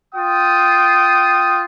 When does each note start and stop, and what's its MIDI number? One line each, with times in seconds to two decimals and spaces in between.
0.15 1.65 65
0.15 1.65 79
0.15 1.65 87